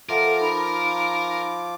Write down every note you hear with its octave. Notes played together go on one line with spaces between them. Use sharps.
F3 F4 A4 A#4 E5 F#5 D6
D#4 B5